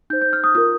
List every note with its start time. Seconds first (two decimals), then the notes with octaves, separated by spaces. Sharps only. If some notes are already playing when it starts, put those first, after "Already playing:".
0.10 D#4 G6
0.13 C5
0.22 G6
0.33 F6
0.44 D#6
0.55 F4 A#4 D#6